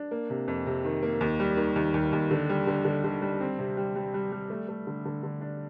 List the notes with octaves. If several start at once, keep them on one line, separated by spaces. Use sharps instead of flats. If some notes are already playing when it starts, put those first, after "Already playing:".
Already playing: D4
A#3
C3
F2
C3
D#3
A#3
D#2
G3
D#3
D#2
D#2
D#2
D3
G3
D3
D3
D3
G3
C4
C3
G3
G3
G3
G3
A3
A3
D3
D3
D3
D4